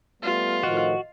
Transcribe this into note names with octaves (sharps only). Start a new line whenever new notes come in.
G3 A3 B3 F4
A2 D#3 F3 F#4 D#5